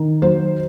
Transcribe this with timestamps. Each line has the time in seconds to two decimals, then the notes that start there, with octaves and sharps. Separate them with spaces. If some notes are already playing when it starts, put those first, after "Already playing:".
Already playing: D#3
0.22 F#3 C5